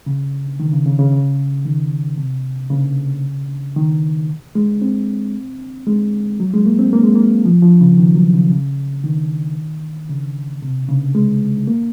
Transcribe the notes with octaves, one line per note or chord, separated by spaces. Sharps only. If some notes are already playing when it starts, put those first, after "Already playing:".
C#3
D#3
C#3
C#3
C#3
C#3
D#3
C3
C#3
D#3
G#3
C4
G#3
F#3
G#3
A#3
C4
A#3
G#3
A#3
F3
F3
C#3
D#3
F#3
C#3
C#3
D#3
C#3
C3
C#3
G#3
A#3